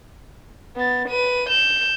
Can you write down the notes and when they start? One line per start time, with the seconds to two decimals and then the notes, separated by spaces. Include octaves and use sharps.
0.76 B3 A6
1.09 B4 D#7
1.49 G6 E7